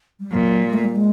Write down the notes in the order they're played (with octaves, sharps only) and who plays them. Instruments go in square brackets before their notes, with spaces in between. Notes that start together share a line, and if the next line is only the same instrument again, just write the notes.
[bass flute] G3
[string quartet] A#2 [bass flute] F#3
[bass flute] G3
A3
G3
G#3